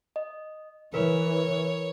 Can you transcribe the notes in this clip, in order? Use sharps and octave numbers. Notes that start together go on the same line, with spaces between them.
D#5
E3 A#4 B4 C#5